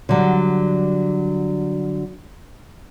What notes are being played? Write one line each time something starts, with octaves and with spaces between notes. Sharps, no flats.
D3 F#3 G3